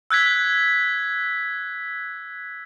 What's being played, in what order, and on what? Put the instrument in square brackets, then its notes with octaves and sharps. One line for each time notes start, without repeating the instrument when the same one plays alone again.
[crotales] E6 F#6 G#6 B6